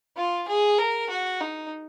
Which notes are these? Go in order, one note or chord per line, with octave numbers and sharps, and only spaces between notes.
F4
G#4
A#4
F#4
D#4